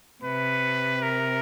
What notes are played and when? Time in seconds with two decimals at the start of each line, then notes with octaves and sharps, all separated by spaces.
0.23 C3 B4
1.02 A#4